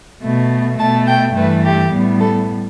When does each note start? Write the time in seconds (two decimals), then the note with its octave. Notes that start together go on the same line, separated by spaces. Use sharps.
0.23 B2 A3
0.79 B2 A3 A5
1.07 G5
1.36 G2 E3 A3 B4
1.64 G4
1.93 A2 G3 B3
2.20 A4